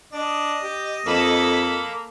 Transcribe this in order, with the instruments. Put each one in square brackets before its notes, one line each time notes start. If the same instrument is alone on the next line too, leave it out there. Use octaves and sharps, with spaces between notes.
[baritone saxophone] D4 [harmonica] D#5
[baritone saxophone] G4
[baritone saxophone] F2 [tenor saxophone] A#3 [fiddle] A4 B5